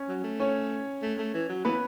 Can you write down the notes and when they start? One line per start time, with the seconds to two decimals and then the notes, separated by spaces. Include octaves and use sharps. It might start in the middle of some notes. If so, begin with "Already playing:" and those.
Already playing: C#4
0.09 F#3
0.24 A3
0.40 C#4 C#5
1.02 A3
1.19 A3
1.34 E3
1.49 F#3
1.65 E3 B3 B4